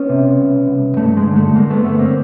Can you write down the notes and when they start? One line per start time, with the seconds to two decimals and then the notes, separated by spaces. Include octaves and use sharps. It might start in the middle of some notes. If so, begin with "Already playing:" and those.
Already playing: B3 C#4
0.09 C3
0.39 C2
0.68 C2
0.97 G2 A3
1.09 A3
1.17 G#3
1.26 D3
1.36 A3
1.55 G2 G#3 A#3
1.70 A3 B3
1.84 D3 A3 B3
1.99 A#3 C4